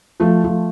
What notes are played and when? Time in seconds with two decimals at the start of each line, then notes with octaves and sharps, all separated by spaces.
0.20 F3 A3
0.44 F3 A3